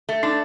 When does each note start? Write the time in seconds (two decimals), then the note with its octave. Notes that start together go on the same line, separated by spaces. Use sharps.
0.09 A3
0.23 D4 D#4